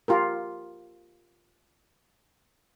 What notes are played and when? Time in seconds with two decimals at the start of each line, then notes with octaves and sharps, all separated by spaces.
0.08 F4 G4 A#4